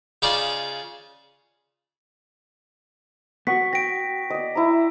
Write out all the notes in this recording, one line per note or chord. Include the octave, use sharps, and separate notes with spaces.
C#3 D#4 F4 D5 D6
B3 F#4 F#5 C#6 B6
G5 A#6 D7
D5 D#5
E4 E5 A#5